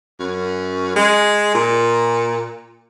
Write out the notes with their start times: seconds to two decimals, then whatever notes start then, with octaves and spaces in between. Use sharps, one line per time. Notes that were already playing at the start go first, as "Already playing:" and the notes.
0.20 F#2
0.96 G#3
1.55 A#2